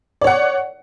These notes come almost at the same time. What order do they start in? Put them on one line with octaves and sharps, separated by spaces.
D5 C#5 F#5